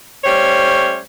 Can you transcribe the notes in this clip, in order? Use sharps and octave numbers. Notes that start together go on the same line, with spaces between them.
G3 A3 C#4 C5 C#5